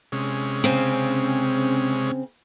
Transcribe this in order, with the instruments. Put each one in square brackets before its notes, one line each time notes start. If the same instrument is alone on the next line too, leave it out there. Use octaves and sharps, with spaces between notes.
[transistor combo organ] C3 G#3 C#4
[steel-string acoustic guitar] C#3 C4